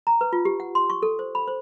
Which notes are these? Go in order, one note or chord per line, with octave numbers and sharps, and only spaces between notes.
A#5
B4
F4
G4
F#5
C6
C#6
A4
C5
B5
C5